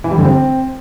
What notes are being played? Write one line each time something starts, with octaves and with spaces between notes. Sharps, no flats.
E3
G3
D3
C4